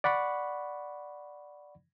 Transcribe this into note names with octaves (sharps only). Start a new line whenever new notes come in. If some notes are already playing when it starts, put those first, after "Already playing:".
D5 F#5 B5 C#6